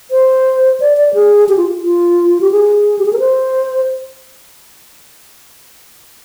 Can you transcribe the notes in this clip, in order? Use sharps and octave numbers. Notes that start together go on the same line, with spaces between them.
C5
D5
D5
G#4
G4
F4
F4
G4
G#4
G4
G#4
A#4
C5